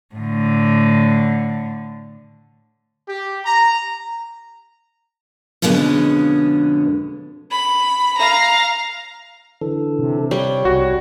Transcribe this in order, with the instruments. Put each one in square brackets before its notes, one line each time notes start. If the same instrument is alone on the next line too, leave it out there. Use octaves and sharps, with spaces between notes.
[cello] A2 D3
[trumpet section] G4
A#5
[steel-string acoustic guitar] F2 B2 D3 G#3 B3 C#4
[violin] B5
F5 A#5
[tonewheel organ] D3 E3 A4
[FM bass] C3
[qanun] G3 [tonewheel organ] C#5
[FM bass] C2 [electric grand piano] F#4